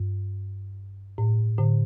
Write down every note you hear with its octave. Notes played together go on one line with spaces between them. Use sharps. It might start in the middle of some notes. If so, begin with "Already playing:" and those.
Already playing: G2
A2
A2 D3